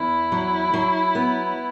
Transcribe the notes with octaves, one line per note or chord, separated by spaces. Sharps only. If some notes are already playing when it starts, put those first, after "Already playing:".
Already playing: E2 E4
F#3
F#3
B3